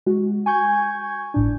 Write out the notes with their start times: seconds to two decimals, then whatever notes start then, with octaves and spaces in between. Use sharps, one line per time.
0.06 G#3 F#4
0.46 G#5 C#6 G6 G#6
1.34 G1 A2 D4